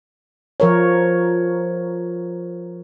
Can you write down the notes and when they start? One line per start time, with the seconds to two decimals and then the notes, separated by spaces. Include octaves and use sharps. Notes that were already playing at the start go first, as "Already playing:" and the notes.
0.60 F3 A#4 C#5